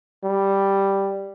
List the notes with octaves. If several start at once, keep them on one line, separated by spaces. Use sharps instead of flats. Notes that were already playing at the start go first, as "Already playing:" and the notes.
G3